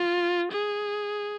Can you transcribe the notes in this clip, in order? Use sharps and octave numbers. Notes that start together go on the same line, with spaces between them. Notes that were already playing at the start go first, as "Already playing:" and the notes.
Already playing: F4
G#4